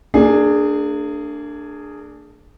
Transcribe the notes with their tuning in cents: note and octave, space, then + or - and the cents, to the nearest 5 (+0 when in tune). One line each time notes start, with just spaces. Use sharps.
A#3 -40 D4 +5 G#4 +0